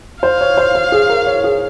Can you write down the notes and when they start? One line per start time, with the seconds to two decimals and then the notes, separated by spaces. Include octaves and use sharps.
0.23 C5 F5
0.41 C#5
0.57 C5
0.75 C5
0.92 G#4
1.09 A#4
1.27 C#5
1.44 G#4